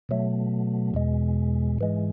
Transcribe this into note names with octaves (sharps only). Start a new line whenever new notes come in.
B2 F#3 A3
E2 B2 G#3
G#2 E3 G#3